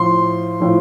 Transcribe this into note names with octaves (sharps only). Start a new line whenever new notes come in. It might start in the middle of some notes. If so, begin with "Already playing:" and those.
Already playing: A2 F3 C6
A2 F3